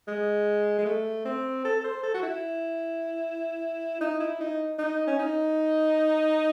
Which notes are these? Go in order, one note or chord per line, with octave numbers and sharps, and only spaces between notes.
G#3
G#3
A3
C4
A4
A4
C5
A4
F#4
E4
D#4
E4
D#4
D#4
C#4
D#4